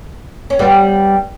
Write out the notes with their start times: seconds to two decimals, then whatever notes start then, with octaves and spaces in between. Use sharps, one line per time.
0.50 C#4
0.59 G3 B3